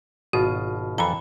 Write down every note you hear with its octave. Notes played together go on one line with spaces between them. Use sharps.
G#1 B2 F4 F#4
F2 E3 A4 A#5 B5